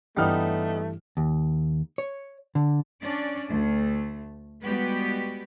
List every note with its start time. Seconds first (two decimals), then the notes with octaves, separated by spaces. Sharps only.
0.17 G2 E3 G3 A3 B3 D#4 F6
1.17 D#2
1.98 C#5
2.55 D3
3.01 C#4 D4 D5
3.49 D2 A3
4.62 G3 G#3 B3 F#4 G4 B4